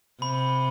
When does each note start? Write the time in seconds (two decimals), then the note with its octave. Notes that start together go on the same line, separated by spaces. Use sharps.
0.22 C3 B5